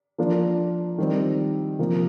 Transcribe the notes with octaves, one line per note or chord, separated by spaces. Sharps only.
F3 A#3 D4 F4
D#3 G3 C4
C3 F3 A#3